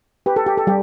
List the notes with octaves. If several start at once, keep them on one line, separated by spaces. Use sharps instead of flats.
G4 B4
A4
G4
A4
G3 G4